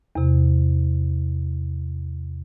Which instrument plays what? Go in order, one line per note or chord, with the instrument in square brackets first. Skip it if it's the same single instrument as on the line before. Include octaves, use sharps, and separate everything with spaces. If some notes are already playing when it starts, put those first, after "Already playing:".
[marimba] E2 C3